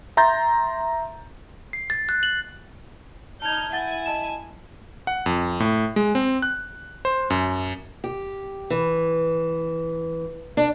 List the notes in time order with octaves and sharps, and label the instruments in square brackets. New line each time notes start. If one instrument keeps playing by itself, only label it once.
[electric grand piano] E5 A#5 C6 G6 A6
[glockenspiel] C7
A6
F#6
F#7
[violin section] D#4 F6 G6 [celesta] A5 G#6
[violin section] E4 G#5 [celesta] F#5 A6
[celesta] D#5 A5 E7
[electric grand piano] F#5
F2
A2
G#3
C4
F#6
C5
F#2
[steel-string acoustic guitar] G4
E3
D4